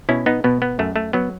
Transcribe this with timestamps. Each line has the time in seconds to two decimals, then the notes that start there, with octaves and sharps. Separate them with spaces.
0.09 B2 C#4 E4
0.26 B3 D#4
0.44 B2 B3
0.62 B3
0.79 F#2 A3
0.96 A3
1.13 F#3 B3